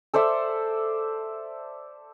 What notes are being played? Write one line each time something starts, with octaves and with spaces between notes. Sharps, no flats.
A4 C5 D5 E5